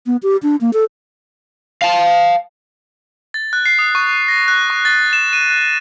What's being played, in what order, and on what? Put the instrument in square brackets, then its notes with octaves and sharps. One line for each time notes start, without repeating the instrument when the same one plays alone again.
[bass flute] B3
G4
D4
A#3
A4
[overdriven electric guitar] F5 A5
[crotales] A6
F#6
C7
D#6
C#6
A#6
F#6
C#6
A6
E7
D#7
F#6